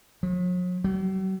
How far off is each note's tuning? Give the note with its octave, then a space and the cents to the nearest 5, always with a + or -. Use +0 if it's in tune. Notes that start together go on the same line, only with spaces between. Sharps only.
F#3 -45
F#3 +45